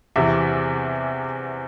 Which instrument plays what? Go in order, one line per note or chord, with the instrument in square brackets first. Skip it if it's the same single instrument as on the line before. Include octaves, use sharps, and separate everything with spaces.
[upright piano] E2 C3 E3 E5